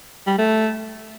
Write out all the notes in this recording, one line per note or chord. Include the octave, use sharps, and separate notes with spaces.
G3
A3